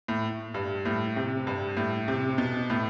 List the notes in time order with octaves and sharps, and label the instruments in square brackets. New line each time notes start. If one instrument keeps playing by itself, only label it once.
[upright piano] A2
G2
A2
C3
G2
A2
C3
B2
A2